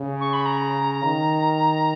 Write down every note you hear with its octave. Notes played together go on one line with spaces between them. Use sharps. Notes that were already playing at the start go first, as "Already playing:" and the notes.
Already playing: C#3
C#6
B5
A#5
D#3